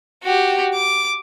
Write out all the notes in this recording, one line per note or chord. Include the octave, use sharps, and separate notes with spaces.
F#4 G4
D6